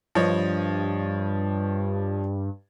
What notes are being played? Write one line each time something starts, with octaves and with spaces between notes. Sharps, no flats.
G2 F3 C#5 D#5